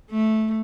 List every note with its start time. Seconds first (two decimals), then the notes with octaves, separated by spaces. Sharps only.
0.10 A3